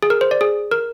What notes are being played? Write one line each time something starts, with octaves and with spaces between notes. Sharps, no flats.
G#4
A#4
C5
D5
G#4
A#4